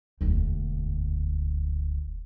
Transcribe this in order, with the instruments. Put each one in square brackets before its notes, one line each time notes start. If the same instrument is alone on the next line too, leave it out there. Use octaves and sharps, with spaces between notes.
[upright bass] E1 D2